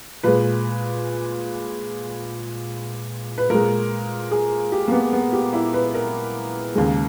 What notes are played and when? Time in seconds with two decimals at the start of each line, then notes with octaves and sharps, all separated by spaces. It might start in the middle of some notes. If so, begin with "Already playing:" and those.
0.23 A#2 G#3 B4
3.38 B4
3.50 A#2 G#3 A#4
4.31 G#4
4.72 G4
4.88 A#3
4.92 B3
5.13 B3
5.33 G4
5.53 E4
5.74 B4
5.94 A#4
6.75 D#2 C#3 G#3